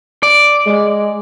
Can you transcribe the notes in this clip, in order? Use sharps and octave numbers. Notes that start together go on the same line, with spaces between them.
D5
G#3